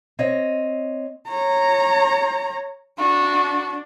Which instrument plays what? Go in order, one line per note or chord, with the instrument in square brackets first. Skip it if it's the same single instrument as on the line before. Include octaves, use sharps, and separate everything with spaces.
[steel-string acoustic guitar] C4 C#5 D#5
[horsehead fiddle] C#5 A#5
[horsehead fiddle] D4 [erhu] F#4